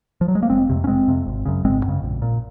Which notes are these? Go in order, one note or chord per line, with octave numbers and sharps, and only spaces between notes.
F3
F#3
G#3
A#3
F1 G#3 C4
F2 C3
C#4
F1 G#3 C4
F2 C3
G#1
F#2 C#3
G#1 G#3 C4
F#2 C#3
A#1
A#2